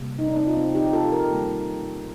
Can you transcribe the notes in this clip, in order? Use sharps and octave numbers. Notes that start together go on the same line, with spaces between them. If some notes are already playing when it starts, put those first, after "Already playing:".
Already playing: C3 G3 A#3
D#4
D4
C4 D#4
F4
C4 D#4
D#4 G4
F4 A4
G4 A#4
D#3 G3 A#3